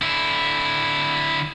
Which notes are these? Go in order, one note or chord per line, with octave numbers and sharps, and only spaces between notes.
D3 E4